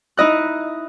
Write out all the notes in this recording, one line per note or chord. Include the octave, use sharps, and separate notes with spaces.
D#4 E4 D#5 F#6